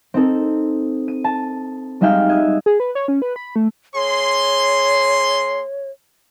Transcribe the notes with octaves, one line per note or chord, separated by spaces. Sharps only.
C4 D#4 A4
D#7
A5
G3 G#3 D#4 E5 F5 G5
D#5 E6 F#6 G#6
G#4
B4
C#5
C#4
B4
B5
A3
A#3 G#4 C#5 C6